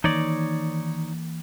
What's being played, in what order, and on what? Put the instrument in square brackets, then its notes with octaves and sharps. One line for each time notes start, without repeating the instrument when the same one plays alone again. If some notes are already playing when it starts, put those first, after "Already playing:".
[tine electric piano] D#3 [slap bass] E3 A#3 [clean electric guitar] D#4 C#5 D5